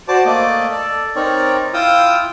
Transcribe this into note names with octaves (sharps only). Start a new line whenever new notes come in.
F#4 C5 D5 A5 D6
A3 A#3 D5 D#5 D6
A4 D5
C4 D#4 A#4 C#5 D5
E4 F4 F5 G5 D#6 E6